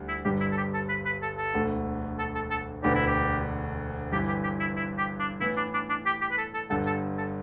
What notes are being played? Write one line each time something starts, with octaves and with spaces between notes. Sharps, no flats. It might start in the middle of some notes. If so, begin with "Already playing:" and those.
Already playing: D2 G3
E4
G1 G2 G3 G4
E4
A4
G4
A4
B4
B4
A4
A4
E1 D2 D3 A3
A4
A4
A4
E1 D2 D3 B3 D4 G4
E4
G4
G1 G2 E3 G4
G4
G4
E4
E4
G4
D4
A2 E3 B3 E4
D4
D4
D4
G4
G4
B4
A4
A4
G1 G2 D3 A4
A4
A4